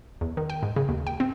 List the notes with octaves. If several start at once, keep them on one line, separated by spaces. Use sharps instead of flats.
E2
D#3
G5
G#2
C#3
D#2
G5
C4